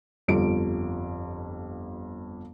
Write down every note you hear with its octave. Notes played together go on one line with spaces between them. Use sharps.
G1 F2 G3 D7